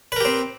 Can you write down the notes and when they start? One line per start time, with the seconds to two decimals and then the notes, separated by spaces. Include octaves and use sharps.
0.12 B4
0.16 A#4
0.21 G4
0.25 C4